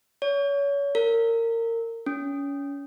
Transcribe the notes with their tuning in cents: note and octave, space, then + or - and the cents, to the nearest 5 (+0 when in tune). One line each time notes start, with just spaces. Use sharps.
C#5 +30
A#4 -25
C#4 +30